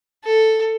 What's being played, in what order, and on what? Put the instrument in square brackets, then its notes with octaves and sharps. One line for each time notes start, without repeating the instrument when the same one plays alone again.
[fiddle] A4